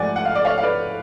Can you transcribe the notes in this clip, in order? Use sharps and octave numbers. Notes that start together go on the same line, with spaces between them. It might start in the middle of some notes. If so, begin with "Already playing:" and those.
Already playing: G#2 F3 A3 D5 F#5 G#5
F#5
F5
D5
C#5 F5
F5
B4 D5